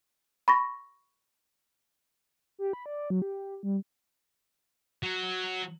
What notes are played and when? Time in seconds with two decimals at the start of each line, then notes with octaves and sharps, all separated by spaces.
0.48 B5 C#6 A#6
2.59 G4
2.73 B5
2.86 D5
3.10 F#3
3.22 G4
3.63 G3
5.03 F#3